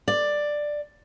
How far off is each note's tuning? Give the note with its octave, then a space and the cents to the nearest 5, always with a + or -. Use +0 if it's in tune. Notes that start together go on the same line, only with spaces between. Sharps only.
D5 +10